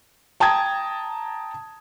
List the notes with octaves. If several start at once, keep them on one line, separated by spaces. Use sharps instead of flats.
G5 A5 A#5 D#6 G#6